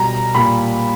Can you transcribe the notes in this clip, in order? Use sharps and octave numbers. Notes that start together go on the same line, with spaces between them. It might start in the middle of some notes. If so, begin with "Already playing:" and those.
Already playing: B2 G3 A#5
A#2 G3 B5